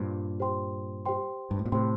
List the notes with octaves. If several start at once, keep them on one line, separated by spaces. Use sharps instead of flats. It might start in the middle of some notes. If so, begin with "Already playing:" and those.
Already playing: G2 A#2 G4 C5 C6
G4 C5 G5 C6
G4 C5 G5 C6
G2
A2
A#2
A2 C3 G4 C5 G5 C6